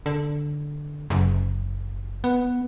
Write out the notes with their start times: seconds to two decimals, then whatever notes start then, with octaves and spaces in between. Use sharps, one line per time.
0.06 D3
1.10 F#1
2.24 B3